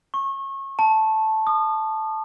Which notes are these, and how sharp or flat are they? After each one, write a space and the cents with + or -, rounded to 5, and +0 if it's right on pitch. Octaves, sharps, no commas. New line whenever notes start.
C#6 -30
A5 -5
D#6 -35